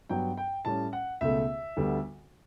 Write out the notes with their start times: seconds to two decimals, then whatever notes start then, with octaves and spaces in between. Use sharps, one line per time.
0.09 G2 F#3 B3 G5
0.37 G5
0.65 A2 G3 C#4 A5
0.93 F#5
1.21 C#2 B2 A3 E5
1.77 D2 D3 G3 B3